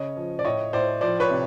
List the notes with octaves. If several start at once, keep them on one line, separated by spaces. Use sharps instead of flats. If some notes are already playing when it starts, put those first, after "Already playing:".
Already playing: C#3 C#5 D#5
F3
D5
A2 C#5 D#5
A2 C5 D5
F3 C5 D5
B4 C#5
C3